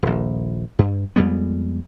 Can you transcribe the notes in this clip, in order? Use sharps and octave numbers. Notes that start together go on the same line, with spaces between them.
D#1 A#1
G2
F2 G3 G#3 B3